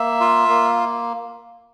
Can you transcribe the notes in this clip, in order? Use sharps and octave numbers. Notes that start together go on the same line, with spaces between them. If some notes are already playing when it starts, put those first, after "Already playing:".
Already playing: A#3 E5
F4
A#3